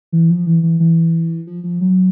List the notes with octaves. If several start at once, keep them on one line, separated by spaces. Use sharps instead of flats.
E3
F3
E3
E3
E3
F3
F3
F#3